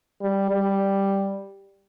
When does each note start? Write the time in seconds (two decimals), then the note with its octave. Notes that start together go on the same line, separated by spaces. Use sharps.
0.22 G3
0.51 G3